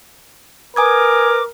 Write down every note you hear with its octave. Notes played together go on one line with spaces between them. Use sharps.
A#4 B4 G#5 D6 D#6 G#6